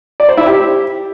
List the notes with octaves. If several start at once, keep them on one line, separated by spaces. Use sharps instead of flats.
D5
C5
E4
G4